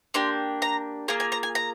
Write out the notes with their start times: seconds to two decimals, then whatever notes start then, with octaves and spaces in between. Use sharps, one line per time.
0.14 A#3 D4 G4 C6
0.62 A#5
1.08 A#3 F4 G#4 A#5
1.20 G#5
1.32 A#5
1.43 G#5
1.55 A#5